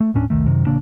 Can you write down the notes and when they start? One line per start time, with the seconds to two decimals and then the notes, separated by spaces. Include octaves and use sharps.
0.01 A3
0.14 D#1 A2 C#4 D4
0.30 F1 C2 D#3 A3
0.46 F#2 C3 D#3
0.67 A1 C#3 A#3 D4